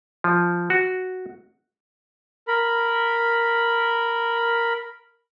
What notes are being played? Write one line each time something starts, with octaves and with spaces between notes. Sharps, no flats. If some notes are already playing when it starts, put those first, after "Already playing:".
F3
F#4
A#4 B5